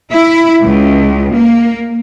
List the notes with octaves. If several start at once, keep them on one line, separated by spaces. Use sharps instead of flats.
E4
C#2
A#3